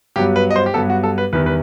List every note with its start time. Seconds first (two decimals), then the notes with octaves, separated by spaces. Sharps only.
0.16 G2 F#3 B3 G4
0.36 B4
0.51 D#5
0.56 C5
0.66 G4
0.74 G2 F#3 B3 A4
0.90 F#4
1.03 A4
1.18 B4
1.33 E2 D#3 G3 B4
1.46 B4